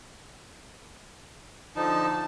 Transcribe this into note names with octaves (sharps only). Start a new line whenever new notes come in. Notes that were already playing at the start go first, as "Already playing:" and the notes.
D3 F3 D#4 A5